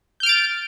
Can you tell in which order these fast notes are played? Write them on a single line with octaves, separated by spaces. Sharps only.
G6 F6 D7 A6